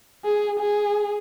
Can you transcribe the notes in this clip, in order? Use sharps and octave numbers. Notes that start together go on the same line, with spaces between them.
G#4
G#4